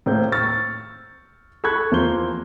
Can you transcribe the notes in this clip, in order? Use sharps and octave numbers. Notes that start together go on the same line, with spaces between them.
A2 A#3 C4 G6
C#6 E6 F6 A6
A4 B5 C#6 F#6 G#6
E2 F3 A#3 C6 G6 G7